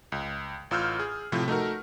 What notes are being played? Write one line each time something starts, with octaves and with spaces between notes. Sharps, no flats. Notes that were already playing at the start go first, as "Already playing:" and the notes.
C#2
A1 F4 E6 F6 G6
G#4
A2 C3 F3
A3 D#4 F#4 A#4